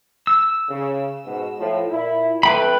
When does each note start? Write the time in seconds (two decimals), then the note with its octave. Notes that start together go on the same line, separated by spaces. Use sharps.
0.27 E6
0.69 C#3
1.25 G#2 B2
1.58 A2 F3
1.91 A#2 E4
2.43 F2 A3 B4 G5 B5